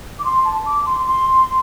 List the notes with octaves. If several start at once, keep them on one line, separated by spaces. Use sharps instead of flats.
D6
C6
A5
D6
C6
C6